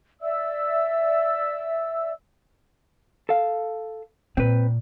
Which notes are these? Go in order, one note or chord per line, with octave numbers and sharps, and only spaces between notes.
D5 E5 E6
A4 F5
A#2 C4 B4